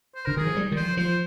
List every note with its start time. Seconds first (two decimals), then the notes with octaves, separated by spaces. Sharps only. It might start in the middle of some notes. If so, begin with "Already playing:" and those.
0.15 C5
0.26 D3 A#4
0.37 D#3 G#4
0.46 F3
0.57 G3
0.72 D#3
0.76 F3 C5
0.97 F3 C5